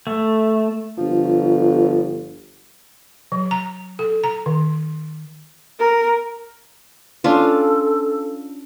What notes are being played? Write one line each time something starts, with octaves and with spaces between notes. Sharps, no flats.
A3
G1 F3
F#3
A#5
A4
A#5
D#3
A#4
C#4 D4 F4 A4